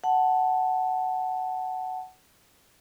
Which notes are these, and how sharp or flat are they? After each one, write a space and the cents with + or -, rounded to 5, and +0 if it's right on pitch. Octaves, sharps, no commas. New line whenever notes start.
F#5 +5 A5 +0